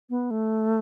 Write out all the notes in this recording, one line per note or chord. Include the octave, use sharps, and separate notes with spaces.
B3
A3